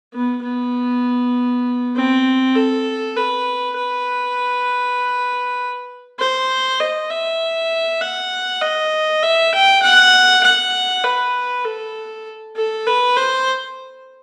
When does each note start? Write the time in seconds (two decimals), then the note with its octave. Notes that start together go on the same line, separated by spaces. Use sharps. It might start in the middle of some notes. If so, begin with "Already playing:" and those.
0.14 B3
0.44 B3
1.96 C4
2.56 A4
3.17 B4
3.78 B4
6.19 C5
6.80 D#5
7.10 E5
8.01 F#5
8.62 D#5
9.23 E5
9.53 G5
9.83 F#5
10.43 F#5
11.04 B4
11.64 A4
12.56 A4
12.87 B4
13.17 C5